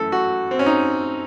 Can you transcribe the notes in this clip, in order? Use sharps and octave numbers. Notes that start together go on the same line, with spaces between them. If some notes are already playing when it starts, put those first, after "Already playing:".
Already playing: F#2 E3 A3 A4
F#4
C4
C#4
D#4